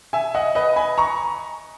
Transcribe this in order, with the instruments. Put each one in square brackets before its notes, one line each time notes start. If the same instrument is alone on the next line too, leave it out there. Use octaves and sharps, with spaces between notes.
[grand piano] E5 G#5
D#5 F#5
B4 D#5
G#5 B5
A#5 C#6